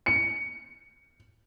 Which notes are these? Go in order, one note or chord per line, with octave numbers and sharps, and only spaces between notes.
C#7